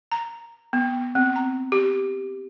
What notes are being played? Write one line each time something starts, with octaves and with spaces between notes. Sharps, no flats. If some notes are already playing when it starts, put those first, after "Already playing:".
A#5
B3
C4
A#5
G4